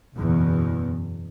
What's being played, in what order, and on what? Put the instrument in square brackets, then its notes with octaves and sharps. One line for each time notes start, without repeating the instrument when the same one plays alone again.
[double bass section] F#1 E2 B2